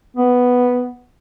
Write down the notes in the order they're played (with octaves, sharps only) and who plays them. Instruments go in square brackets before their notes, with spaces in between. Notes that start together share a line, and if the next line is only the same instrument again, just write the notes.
[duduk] B3